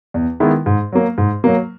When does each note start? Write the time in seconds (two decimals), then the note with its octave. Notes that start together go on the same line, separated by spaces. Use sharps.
0.14 E2
0.40 D#3 G#3 B3 E4
0.66 G#2
0.93 F#3 A#3
1.18 G#2
1.44 F#3 A#3